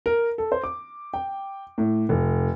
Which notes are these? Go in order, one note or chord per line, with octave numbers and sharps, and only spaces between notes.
A#4
A4
C5
D6
G5
A2
F1